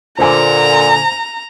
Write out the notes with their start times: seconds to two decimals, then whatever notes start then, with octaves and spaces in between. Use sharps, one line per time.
0.19 A#2 D3 C5 G#5 A#5